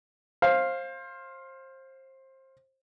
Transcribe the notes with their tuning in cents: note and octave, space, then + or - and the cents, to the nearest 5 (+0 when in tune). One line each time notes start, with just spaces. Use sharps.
C5 +25 F5 +0